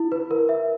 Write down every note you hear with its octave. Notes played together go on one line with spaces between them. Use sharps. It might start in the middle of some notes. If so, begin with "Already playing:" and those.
Already playing: E4
B4
A#4
E5